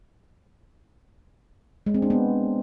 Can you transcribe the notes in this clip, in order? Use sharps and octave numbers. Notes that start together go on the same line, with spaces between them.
G#3
C4
D4
B3